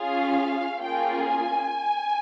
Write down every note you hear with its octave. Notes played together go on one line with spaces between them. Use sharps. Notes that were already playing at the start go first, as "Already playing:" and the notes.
Already playing: C#4 F4 G#4 F5
A#3 C#4 F4 G#4 G5
G#5